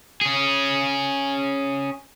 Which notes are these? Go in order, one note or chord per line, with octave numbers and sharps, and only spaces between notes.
C#4 G#4